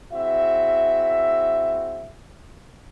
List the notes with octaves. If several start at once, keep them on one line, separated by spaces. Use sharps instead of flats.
C4 E4 F#4 G#4 E5